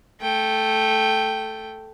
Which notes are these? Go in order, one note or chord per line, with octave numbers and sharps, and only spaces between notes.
A3 G5